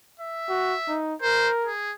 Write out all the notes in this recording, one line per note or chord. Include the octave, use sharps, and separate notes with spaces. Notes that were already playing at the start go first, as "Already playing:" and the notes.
E5
F#4
D#4
A#4 C5
G#4